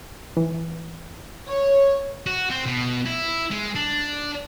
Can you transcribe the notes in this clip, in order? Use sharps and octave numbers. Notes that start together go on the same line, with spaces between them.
E3
C#5
F#4
C4
B2
E4
G#3
D4